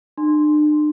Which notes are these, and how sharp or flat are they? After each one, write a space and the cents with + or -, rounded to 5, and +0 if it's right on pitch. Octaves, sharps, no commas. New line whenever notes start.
D4 +45 C6 +0